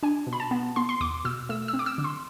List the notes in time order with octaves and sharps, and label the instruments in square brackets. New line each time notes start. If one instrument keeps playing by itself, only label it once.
[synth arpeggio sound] D4 G#5
B2
B5
A5
B3
B3 C6
C6
E2 D6
B2 E6
A3 E6
E6
C4
D6
E6
D3
C6